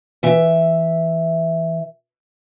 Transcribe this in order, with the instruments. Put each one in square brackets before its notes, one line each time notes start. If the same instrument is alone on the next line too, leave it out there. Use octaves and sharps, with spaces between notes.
[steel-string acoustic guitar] E3 E5